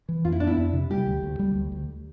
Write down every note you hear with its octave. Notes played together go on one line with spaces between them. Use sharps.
E3
F2 F4
E4
B3 D4
E4
F2
C3
G3 G4
D2
D2
G3
D2
D2